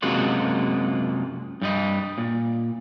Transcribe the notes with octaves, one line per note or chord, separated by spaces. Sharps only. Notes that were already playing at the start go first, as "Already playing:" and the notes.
F#2 C3 G#3 A#3 F4 F#4
G2 G3 D#5
A#2